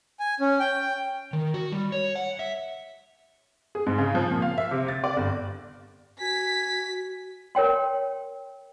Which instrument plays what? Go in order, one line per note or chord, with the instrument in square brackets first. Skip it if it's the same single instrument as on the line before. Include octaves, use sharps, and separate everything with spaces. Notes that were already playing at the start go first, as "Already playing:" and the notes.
[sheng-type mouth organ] G#5
C#4
G5
[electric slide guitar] D#3
F#4
G3
C#5
F#5
E5
[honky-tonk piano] G#4
G#2
C#3
F3
A#2
F5
E5
C3
A6
D5
G1
[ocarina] F#4 [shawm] G#5 [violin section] B6
[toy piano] A#4 C#5 G5 C6